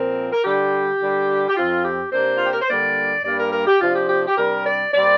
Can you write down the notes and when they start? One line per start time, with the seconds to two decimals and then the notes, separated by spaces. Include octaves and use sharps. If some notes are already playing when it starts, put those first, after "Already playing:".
Already playing: A#2 F3 C4 A#4
0.33 A#4
0.44 D3 G3 D4 G4
1.00 D3 G3 D4
1.48 G4
1.56 F2 F3 C4 F4
1.84 G4
2.12 C3 A#3 D4 C5
2.38 F4
2.45 G4
2.53 A#4
2.62 C5
2.69 D3 G3 A#3 D4 D5
3.25 G2 G3 A#3 D4 D5
3.40 A#4
3.53 A#4
3.67 G4
3.81 C3 F3 D4 F4
3.96 G4
4.10 G4
4.27 G4
4.38 C3 G3 D4 A#4
4.66 D5
4.93 A#2 G3 C4 D5